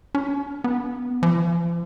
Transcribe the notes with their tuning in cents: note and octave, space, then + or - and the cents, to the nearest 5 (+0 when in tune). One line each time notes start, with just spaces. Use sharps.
C#4 +45
B3 +5
F3 -40